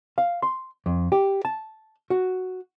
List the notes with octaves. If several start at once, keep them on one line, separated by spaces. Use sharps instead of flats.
F5
C6
F2
G4
A5
F#4